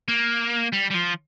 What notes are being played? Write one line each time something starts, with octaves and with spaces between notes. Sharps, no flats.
A#3
G3
G3
F3